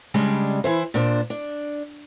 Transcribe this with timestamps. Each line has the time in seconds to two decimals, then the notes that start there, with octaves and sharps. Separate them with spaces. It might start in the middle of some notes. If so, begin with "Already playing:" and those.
0.14 C#3 G3 G#3 D4
0.64 E3 E4 C5
0.94 A#2 D4 C5
1.30 D4